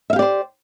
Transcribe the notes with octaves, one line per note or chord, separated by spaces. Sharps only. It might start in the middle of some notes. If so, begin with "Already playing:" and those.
G4 C5 D5 E5 F5